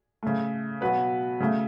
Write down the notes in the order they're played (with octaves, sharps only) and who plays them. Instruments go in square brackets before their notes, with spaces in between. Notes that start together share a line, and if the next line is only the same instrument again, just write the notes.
[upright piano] C#3 A3
B2 F#3 B3 B4
C#3 A3